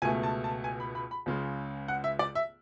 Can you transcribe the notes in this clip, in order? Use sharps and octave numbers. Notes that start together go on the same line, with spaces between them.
C#2 B2 A3 G#5
A5
A5
G#5
B5
B5
B5
C#2 C#3 G#3
F#5
E5
D5
E5